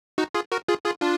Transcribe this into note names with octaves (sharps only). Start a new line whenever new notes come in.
D#4 F#4
F4 G#4
F#4 A#4
F4 G#4
F4 G#4
D4 F4